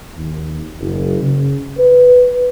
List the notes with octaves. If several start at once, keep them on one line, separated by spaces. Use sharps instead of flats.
D#2
F#1
C#3
B4